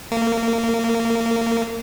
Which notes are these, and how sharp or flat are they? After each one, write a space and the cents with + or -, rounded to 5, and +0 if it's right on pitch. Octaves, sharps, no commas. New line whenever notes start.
A#3 -25